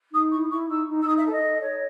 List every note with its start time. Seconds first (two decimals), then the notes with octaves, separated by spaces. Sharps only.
0.11 D#4 D#6
0.30 E4 C#6
0.49 E4 C#6
0.68 D#4 E6
0.87 D#4
1.00 E6
1.06 D#4 D#6
1.18 E5
1.24 A4
1.32 D#5
1.43 A4
1.62 C#5